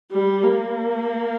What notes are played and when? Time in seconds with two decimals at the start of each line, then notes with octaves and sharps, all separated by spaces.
0.11 G3
0.43 A#3